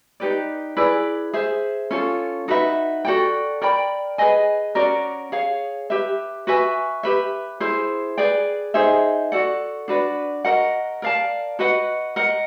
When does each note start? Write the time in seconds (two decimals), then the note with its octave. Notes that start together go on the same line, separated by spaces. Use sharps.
0.20 D#4 G4 B4 D5
0.77 E4 G#4 B4 D5
1.33 G#4 C5 E5
1.91 C#4 F4 A4
2.48 D#4 F#4 B4 E5
3.05 F#4 A4 D5 G5
3.62 A#4 D5 G5 B5
4.18 G#4 B4 D#5 G#5
4.75 C#4 F#4 A#4 D5
5.32 G#4 C#5 F5
5.90 G4 B4 E5
6.47 F#4 B4 E5 G#5
7.03 G4 B4 E5
7.60 E4 G#4 C5
8.18 G#4 B4 D5 G5
8.74 D#4 G#4 C5 E5
9.32 F#4 A4 D5 F#5
9.88 D4 F#4 B4 D5
10.45 F#4 A#4 D#5 F#5
11.02 A#4 D5 F5 A5
11.59 F#4 B4 D#5 F#5
12.16 A#4 D#5 F#5